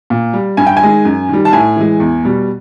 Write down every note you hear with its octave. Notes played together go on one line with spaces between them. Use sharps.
A#2
G3
G2 G#5
G5
G#5
D#3 G#3
F#2
D#3 G3
A5
A2 G#5
E3 G#3
E2
B2 G3